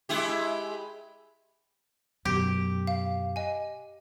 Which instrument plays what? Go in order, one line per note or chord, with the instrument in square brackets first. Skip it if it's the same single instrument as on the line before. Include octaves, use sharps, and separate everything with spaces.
[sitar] G#3 E4 G4
[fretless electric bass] F#2 B2 [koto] G4
[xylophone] F5
D#5 G#5